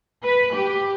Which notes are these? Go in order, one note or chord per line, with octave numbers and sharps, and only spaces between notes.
B4
G4